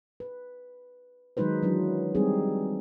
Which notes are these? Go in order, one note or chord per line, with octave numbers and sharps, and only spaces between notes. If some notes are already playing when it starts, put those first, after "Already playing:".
B4
D#3 F#3 G#3 D#4 B4 C5
E3 F#3 D4
G3 G#3 C4 D#4 G#4